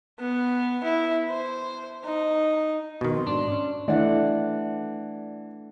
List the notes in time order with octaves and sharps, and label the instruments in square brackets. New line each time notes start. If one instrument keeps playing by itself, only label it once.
[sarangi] B3
E4
C5
D#4
[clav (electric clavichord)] B2 D#3 [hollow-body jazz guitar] D#4 [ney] F#4
[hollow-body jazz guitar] F3 C4 [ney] C6
[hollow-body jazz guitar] G#2 [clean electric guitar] D4
[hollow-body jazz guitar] C#4 D5
[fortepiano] E3 D5 [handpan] A3 D4 F#5